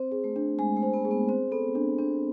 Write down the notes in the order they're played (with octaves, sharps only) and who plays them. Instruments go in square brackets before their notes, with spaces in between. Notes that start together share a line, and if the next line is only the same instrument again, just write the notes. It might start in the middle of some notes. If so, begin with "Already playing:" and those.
Already playing: [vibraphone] C4 [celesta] C5
[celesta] G#4
[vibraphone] A3
[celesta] D4
[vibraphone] G#3 [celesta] G#5
[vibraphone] A3
[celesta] C5
[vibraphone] B3
[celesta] G#4
[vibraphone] B3
[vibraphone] C4 [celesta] C5
[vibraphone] B3 [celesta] A4
[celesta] D4
[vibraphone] C4 [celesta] D4